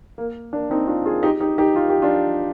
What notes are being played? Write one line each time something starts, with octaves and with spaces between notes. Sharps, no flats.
A#3
A#3 D4
C4 D#4
D4 F4
F4 G#4
D#4 G4
D#4 G4
D#4 G4
F4
G4
D4 F4